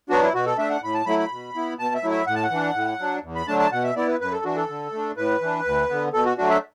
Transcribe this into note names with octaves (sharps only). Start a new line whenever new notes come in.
F#3 B3 D4 F#4
E4
B2 F#4
A4
A3 D4 E5
F#5
A2 B5
A5
F#3 A3 E4 B5
B5
B2
B3 E4
B2 A5
E5
F#3 A3 E4
E5
A2 F#5
A5
F#5
E3 D4
A2
F#3 D4
E2
B5
D3 F#3 A3 D4 A5
A5
B2 F#5
E5
B3 E4 D5
B4
F#2 B4
A4
E3 D4 F#4
A4
D3
A3 D4
A2 B4
E3 D4
D2
D3 B3
B2 A4
F#4
F#3 A3 D4 F#4
E5